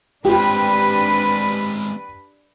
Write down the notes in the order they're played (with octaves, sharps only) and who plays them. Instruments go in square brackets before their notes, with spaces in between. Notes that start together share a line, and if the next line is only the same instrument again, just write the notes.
[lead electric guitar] G#3 C4 [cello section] D4 B4 [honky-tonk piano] G4